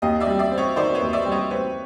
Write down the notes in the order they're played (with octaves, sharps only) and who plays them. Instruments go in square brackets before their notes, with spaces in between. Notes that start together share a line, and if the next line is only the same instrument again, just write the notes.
[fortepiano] D#2 [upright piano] D#5 F5
[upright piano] D5 E5
[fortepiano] G3
[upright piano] D5 E5
[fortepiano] C4
[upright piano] C#5 D#5
[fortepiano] D#3 [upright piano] C5 D5
[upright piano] B4 C#5
[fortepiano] D#2
[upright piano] D5 E5
[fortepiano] G3
[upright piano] C#5 D#5
[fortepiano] C4 [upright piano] B4 C#5